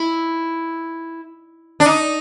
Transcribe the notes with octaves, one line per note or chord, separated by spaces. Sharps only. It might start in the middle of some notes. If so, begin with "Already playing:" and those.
Already playing: E4
D4
D#4